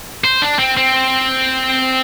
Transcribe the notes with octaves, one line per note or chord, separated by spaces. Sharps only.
C5
D4
C4
C4